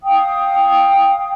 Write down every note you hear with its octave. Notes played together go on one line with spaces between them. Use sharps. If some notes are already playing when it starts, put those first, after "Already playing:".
F5 G5 D#6